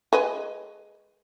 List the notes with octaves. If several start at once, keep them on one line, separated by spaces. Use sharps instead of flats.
G#3 B4 D#5